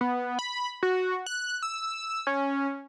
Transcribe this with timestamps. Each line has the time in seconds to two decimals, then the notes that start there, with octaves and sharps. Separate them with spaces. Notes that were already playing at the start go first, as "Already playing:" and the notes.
0.01 B3
0.39 B5
0.83 F#4
1.26 F#6
1.63 E6
2.27 C#4